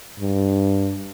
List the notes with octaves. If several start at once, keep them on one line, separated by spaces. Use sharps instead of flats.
G2